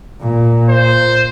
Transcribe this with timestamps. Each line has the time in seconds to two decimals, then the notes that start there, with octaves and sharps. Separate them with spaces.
0.21 A#2
0.69 C5